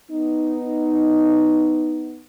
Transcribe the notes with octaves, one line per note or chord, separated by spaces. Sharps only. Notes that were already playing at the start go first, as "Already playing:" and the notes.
B3 D#4